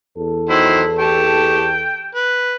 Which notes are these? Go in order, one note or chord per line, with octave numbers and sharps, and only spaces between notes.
E2 A4
D#3 F#3 E4 C5
G4 G5 A5 C#6
B4